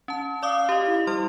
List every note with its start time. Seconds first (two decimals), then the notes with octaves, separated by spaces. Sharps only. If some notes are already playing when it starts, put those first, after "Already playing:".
0.08 C#4 A5
0.43 D5 F5 D6 D#6
0.69 G4 D#5
0.86 E4
1.07 G3 E4 C6 F6